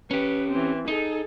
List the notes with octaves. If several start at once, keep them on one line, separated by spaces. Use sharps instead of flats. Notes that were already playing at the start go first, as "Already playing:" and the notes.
C#4 G4 B4
E3 C4
D#4 G#4 A4